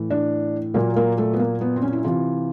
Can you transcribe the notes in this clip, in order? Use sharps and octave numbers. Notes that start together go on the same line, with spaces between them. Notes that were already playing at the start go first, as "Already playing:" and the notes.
Already playing: A2 E3
D4
A#2 F#3 A#3
A#3
A3
B3
A#3
B3
C4
C#4
E4
C3 E3 F4